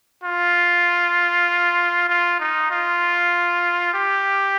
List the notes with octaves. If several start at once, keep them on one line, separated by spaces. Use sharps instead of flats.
F4
F4
D#4
F4
G4